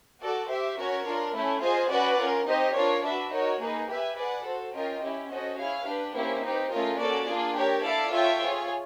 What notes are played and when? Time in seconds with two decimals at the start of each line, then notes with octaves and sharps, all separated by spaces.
0.21 F#4 A4 D5
0.48 G4 C5 E5
0.77 C#4 F#4 A#4 C#5
1.05 D4 F4 A#4
1.34 A3 C#4 E4
1.61 F4 G#4 C5 D#5 G#5
1.90 C#4 F#4 B4 D5 F#5
2.18 C#4 F4 A#4
2.47 C4 D#4 G4 C5 D#5
2.74 D4 F4 A#4 C#5
3.03 D4 F#4 B4 E5
3.31 D#4 F#4 A#4 C#5
3.59 A#3 D#4 G#4 B4
3.88 G4 B4 E5 G#5
4.17 G#4 B4 D5 F#5
4.44 F#4 A4 C5
4.73 C#4 F4 A#4 D#5 G5
5.01 C#4 E4 G4
5.29 C#4 F#4 A4 C5 D#5
5.57 E4 G#4 C#5 F5
5.85 D4 G4 B4
6.13 A#3 C#4 E4 G4 C5
6.42 C4 D#4 G4 B4
6.70 A3 C#4 F4 A#4 D#5
6.98 A#3 C#4 F#4 A4 D5
7.27 A#3 D4 F4 G#4
7.55 G4 A#4 C#5
7.83 E4 A4 D5 F5 A5
8.11 F4 A4 C#5 E5 G5
8.40 F4 G#4 C#5